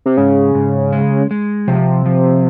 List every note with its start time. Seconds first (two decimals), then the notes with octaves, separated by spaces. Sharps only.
0.06 C3
0.17 G#2 C#3
0.55 G#2
0.92 G#3
1.31 G#3
1.67 C3 F3
2.06 F3